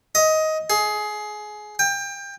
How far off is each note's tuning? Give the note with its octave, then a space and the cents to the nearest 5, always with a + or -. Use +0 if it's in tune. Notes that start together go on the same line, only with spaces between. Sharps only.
D#5 +15
G#4 +20
G5 +25